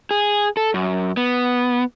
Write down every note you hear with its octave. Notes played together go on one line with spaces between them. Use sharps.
G#4
A4
F#2
B3